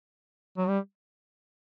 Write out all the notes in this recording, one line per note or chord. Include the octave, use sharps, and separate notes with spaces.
F#3
G3